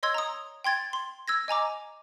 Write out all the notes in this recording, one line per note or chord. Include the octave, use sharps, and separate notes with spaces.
C#5 D#5 C6 E6 G#6
A#5 D#6
G5 C6 G#6 A6
C6
E6 G#6 A#6
D#5 G#5 A#5 D6